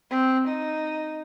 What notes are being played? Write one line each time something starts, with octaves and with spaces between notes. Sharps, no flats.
C4
D#4